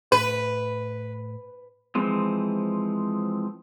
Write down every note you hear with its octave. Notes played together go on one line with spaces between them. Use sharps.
A2 B4
E3 F3 G#3 C4